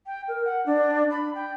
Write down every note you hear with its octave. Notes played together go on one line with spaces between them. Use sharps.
G5
A#4
F#5
D4
B5
G5